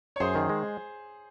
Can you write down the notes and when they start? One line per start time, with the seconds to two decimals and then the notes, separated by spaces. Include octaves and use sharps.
0.16 C#5
0.20 F#2 G#4 C5
0.35 D#3
0.49 G#3